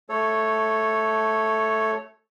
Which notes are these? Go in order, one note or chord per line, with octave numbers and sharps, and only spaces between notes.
A3 A4 C#5